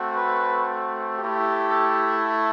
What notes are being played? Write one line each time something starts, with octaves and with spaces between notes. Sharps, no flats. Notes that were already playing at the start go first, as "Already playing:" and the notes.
Already playing: A3 C4 F#4
B4
A3 E4 G4
A4